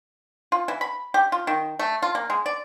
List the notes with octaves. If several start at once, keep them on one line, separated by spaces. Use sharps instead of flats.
F4
E3
B5
G4
F4
D#3
A3
F4
A#3
G#3
D5